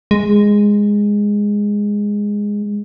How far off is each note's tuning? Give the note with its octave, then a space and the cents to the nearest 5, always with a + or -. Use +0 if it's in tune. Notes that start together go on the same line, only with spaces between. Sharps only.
G#3 -10